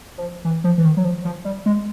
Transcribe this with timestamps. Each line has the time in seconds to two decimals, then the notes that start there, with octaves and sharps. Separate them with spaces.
0.18 F3
0.45 E3
0.64 F3
0.78 E3
0.85 D#3
0.97 F#3
1.04 F3
1.25 F3
1.45 G3
1.66 G#3